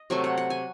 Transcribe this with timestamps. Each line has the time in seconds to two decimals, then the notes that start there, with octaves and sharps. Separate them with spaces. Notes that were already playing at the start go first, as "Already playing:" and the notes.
Already playing: D#5
0.10 C3 F#3 A3 G#5
0.24 F#5
0.38 F#5
0.50 G#5